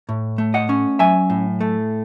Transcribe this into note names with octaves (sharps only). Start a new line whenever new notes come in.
A2
A3
D#5 F#5
C#4
F#3 E5 G#5
A2
A3